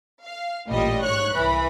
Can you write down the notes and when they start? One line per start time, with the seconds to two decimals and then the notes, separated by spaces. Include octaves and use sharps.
0.24 F5
0.69 A1 A#2 G3 D#5
1.03 G#2 C#5 C#6 F#6
1.34 C2 E3 B5